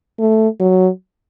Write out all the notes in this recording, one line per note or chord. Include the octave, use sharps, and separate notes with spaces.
A3
F#3